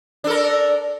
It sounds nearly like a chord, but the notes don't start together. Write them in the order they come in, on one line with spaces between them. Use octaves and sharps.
D4 A4 A#4